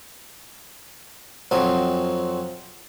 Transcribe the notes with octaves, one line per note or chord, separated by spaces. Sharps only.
F2 F#3 C4 G#5 D#6